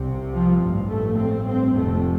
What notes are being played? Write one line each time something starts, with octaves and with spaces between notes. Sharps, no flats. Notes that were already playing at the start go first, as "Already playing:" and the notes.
Already playing: C2 C3
F3
A1 G2
A3
C4
C4
F1 F2 C3 A3